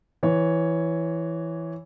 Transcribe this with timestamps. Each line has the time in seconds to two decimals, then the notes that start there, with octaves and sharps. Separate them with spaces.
0.23 E3 C#5